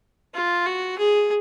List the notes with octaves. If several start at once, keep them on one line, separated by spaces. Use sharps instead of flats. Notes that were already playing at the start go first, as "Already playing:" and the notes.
F4
F#4
G#4